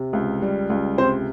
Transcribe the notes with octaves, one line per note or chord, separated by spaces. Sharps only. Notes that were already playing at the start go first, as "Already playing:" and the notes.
Already playing: C3
C#2
G3
C#2
C3 C4 C5